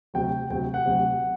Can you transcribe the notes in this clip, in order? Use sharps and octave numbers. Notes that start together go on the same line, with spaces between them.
D2 C3 F#3 G5
D2 C3 F#3 G5
F#5
D2 C3 F#3